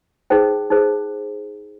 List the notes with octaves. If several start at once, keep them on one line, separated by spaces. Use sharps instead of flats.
D#4 G#4 C5 G5
D#4 G#4 C5